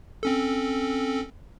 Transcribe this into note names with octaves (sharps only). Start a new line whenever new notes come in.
C4 C#4 A4